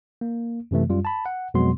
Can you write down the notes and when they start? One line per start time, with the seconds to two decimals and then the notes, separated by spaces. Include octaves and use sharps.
0.21 A#3
0.71 F#2 C3 E3 A3
0.89 F#2 G3 F4
1.05 A5 B5
1.26 F#5
1.54 F2 B2 F#3 G#3 B3 C6